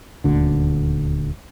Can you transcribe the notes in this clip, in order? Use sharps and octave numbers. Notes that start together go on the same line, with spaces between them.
D#1 D2 D3